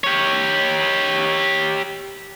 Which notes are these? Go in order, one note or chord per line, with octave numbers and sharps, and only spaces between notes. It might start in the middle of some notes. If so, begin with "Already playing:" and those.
G4 C#5